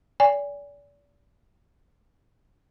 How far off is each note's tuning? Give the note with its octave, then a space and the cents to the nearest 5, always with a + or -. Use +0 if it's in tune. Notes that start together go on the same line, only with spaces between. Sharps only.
D5 -35 G#5 -25